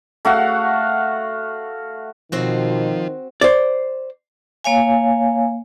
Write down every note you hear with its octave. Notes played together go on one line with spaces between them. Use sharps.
A3 F#4 F5 F#5
B2 D#3 F3 C4 F#4
C5 D5
A#3 C#5 F5 G#5